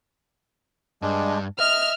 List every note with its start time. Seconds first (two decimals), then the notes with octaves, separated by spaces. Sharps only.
1.02 G2 G#3 D4
1.60 D#5 E5 F6